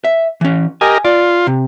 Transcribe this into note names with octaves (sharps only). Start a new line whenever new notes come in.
E5
E3 C#4
G4 A#4 D#5 G#5
F4 D5
C3